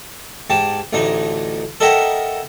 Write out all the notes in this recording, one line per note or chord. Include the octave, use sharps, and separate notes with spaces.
G#2 G4 A5
A1 D2 A2 D#4
A4 A#4 D#5 E5 F#5 G5